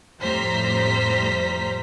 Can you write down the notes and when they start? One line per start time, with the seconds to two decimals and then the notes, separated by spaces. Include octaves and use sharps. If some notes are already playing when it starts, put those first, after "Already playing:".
0.19 F2 A2 G3 C5 A#5 B6